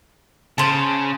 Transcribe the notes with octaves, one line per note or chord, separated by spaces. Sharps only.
C#3 C5 A5